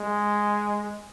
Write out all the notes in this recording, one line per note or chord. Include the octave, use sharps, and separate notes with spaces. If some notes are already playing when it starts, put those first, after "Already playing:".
Already playing: G#3